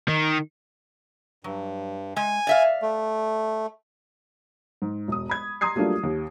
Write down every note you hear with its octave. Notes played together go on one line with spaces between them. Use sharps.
D#3
G2 F#3
G#3 G#5
D5 E5 F5
A3
G#2
E1 D#6
B5 G#6
A#5 C6 D#6 G#6 C7
F#3 G3 A3 A#3 D4 F4
D#2